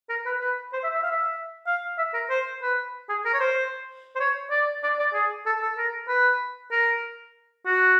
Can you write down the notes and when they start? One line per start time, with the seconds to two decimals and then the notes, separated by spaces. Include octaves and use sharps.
0.09 A#4
0.26 B4
0.40 B4
0.73 C5
0.84 E5
0.94 E5
1.03 F5
1.11 E5
1.67 F5
1.98 E5
2.14 A#4
2.30 C5
2.62 B4
3.09 G#4
3.25 A#4
3.34 C#5
3.40 C5
4.16 C5
4.20 C#5
4.51 D5
4.83 D5
4.99 D5
5.14 G#4
5.46 A4
5.62 A4
5.78 A#4
6.08 B4
6.71 A#4
7.66 F#4